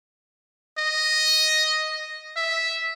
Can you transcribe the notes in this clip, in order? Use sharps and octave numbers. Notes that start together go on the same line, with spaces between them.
D#5
E5